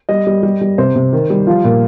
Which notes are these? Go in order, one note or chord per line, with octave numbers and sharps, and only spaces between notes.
G3 D#5
G3
G3
G3
C3 C5
C3
D#3
G3
F3 F4
A#2